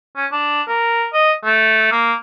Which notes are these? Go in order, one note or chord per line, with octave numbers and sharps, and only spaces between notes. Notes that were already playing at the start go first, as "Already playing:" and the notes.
C#4
D4
A#4
D#5
A3
A#3